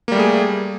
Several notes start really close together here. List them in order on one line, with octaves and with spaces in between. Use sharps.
A#3 G3 A3 G#4